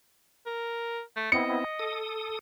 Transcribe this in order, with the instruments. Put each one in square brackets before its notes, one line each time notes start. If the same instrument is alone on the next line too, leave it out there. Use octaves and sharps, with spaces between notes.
[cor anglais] A#4
A3
[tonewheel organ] B3 C4 E4 [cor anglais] D#5 [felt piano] C#7
[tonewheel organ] A4 D#6